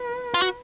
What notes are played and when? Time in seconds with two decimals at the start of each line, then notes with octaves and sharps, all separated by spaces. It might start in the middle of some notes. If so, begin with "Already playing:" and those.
Already playing: B4
0.34 F4
0.42 F#4